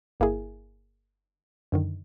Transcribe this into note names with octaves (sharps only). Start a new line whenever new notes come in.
G1 A#3 E4 G#4
F#2 D3 D#3